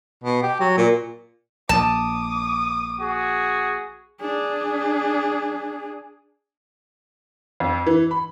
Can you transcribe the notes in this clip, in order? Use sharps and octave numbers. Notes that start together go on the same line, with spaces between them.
B2
G4
F#3
A#2
A#1 A5 D6 D#6
F#4 G#4
D4 G#4
F2
E3
B5